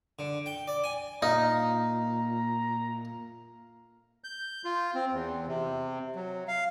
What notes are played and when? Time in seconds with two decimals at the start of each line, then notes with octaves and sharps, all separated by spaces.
0.19 D3
0.46 G5
0.68 D5
0.84 G#5
1.22 A#2 D#4 F5 A#5
4.24 G6
4.65 F4
4.95 C4
5.12 E2
5.47 C3
6.16 F#3
6.48 F5